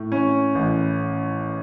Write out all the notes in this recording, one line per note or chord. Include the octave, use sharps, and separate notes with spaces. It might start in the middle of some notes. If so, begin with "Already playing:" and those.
Already playing: A2
C#4
A1